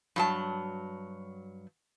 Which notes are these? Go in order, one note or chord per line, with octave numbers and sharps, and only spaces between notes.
G2 F#3 A5